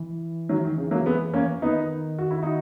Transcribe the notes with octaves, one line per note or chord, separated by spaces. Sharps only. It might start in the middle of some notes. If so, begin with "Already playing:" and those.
Already playing: E3
D#3 F#3
D#3
C#3
F#3 A#3
G#3 B3
A#3 C#4
D#3 B3 D#4
F#4
E4
D#4 F#4